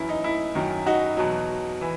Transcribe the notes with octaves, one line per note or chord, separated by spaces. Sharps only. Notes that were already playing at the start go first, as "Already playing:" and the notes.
Already playing: F#2 E3 E4
D#4
E4
F#2 D#3 F#3
D#4 F#4
E2 B2 F#3
E3